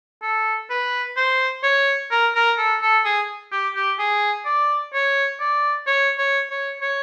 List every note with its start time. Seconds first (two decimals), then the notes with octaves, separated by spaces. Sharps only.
0.22 A4
0.70 B4
1.17 C5
1.63 C#5
2.11 A#4
2.35 A#4
2.58 A4
2.81 A4
3.05 G#4
3.52 G4
3.75 G4
3.99 G#4
4.46 D5
4.94 C#5
5.40 D5
5.87 C#5
6.18 C#5
6.50 C#5
6.81 C#5